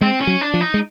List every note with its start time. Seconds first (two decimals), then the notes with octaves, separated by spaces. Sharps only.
0.01 G#3 C4
0.21 C#4
0.27 F#3
0.41 D4
0.54 F3
0.61 D#4
0.74 G#3